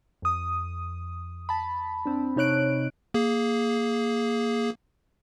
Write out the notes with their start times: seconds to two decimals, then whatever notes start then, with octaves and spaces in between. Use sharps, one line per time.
0.22 F2 D#6
1.49 A5 B5
2.06 C4 D4
2.36 C3 D#4 C#5 F#6 D7
3.14 A#3 G#4